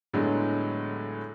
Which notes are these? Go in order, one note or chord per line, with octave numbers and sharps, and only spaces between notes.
A2 D3 F#3 G#3 B3